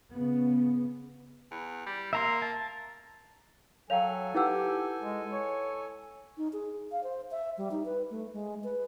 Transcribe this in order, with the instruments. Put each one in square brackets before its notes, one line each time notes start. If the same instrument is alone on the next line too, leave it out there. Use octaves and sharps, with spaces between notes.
[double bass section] C#3 B3
[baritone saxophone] E2
G3
[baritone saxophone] A#3 [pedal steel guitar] E5 A#5 C6
[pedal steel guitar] A5
[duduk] F#3 [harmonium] A4 G#5 [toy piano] C#5 F5 A#5 [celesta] G5 F7
[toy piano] D#4 E6 [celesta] E4 B4 F#5 [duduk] G4
[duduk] G#3
C#5
[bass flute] D#4
G#4
F5
C5
E5
G3
D#4
B4
A3
G#3
B4